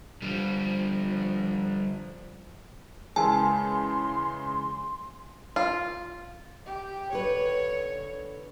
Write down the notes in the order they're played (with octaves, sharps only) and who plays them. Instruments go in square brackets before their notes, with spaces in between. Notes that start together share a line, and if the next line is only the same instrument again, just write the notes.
[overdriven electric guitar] D3 G3 [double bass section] F3
[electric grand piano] C#3 E3 G#3 [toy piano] A#4 A5 [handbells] G#5 [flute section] C6
[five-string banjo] F4
[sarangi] G4
[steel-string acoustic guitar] D3 B4 [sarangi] C#5